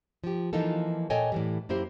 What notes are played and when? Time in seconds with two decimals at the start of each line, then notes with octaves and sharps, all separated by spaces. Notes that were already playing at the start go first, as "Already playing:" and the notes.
0.24 F3 G4
0.53 E3 F3 A#3 D#4 F4 A4
1.10 A#2 A4 C#5 D#5 G5 G#5
1.32 A2 E3 G3
1.69 F#2 A#3 E4 G4 C5